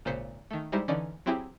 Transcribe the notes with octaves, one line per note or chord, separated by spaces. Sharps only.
G#1 A#2 C#3 C5 B6 C#7
D#3 A3
G3 G#3 D#4 E4 G4 C5
D3 E3 C#4 D#4 D5
F#3 C4 E4 G4 G#4